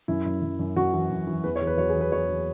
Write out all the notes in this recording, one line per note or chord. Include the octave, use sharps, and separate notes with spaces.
F#2 E4
F#2
F#2
F#2
F#2 F#4
E3
F#2
E3
E2 B4
C#5
E2
B4
F#3 C#5
G#4
E2
B4
E2 C#5
F#3